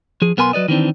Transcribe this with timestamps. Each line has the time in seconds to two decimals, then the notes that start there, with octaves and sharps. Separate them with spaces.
0.22 F3 G#4
0.37 B1 B3 A#4 G#5 B5 C6
0.53 F#3 B4 D5 D#5
0.68 D#3 E3 C4 D4